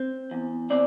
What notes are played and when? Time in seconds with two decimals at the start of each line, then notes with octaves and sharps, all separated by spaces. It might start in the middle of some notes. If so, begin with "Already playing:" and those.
Already playing: C4
0.31 E2
0.70 C4 D5